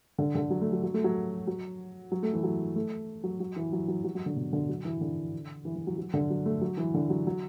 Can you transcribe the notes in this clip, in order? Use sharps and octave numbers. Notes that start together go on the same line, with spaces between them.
D3
D3
F#3
A3
F#3
F#3
A3
F#3
F#3
F#3
A3
E3
F#3
A3
F#3
F#3
E3
F#3
F#3
F#3
F#3
D3
B2
D3
F#3
E3
D3
E3
E3
F#3
F#3
D3
F#3
A3
F#3
E3
D3
F#3
F#3